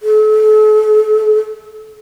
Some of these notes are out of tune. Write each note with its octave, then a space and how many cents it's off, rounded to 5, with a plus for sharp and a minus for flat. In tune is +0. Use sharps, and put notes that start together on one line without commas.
A4 -35